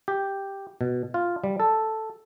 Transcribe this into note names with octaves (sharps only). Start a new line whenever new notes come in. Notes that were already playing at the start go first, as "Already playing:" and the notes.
G4
B2
F4
G3
A4